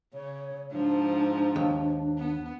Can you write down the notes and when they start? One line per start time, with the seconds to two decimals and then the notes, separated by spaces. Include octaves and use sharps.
0.14 C#3 C#5
0.72 G#2 F3 D4
1.56 D#2
2.18 B3